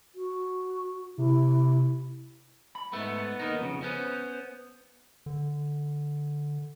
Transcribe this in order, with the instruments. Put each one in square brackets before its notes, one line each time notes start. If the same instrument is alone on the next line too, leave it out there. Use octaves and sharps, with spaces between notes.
[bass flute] F#4
[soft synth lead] C3 [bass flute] E4
[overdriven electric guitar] B5
[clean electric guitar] G#2 A3 [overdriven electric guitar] B3
[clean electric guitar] D#2 D#3 D#4
F2 A2 C#3
[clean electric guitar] B3 C#4 [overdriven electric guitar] C5
[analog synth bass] D3